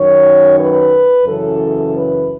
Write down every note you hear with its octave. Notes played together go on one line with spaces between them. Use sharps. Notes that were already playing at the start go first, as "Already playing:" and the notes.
Already playing: F#2 D#3 C#5
B4
F#2 C#3 E3 A4
B4